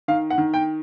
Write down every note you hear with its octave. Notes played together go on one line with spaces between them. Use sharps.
D#3 F5
F#5
D#3
G5